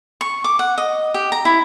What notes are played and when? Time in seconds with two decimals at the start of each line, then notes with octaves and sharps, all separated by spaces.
0.21 C#6
0.44 D6
0.59 F#5
0.78 D#5
1.14 G4
1.32 A#5
1.45 E4